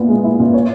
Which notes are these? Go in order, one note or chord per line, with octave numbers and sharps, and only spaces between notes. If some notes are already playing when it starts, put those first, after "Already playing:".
Already playing: A#2 B3 E4
G#3
E4
A#2
C#5